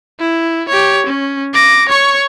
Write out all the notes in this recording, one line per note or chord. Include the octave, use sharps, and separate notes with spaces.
E4
G4 C#5
C#4
D6 A#6
C#5 C#6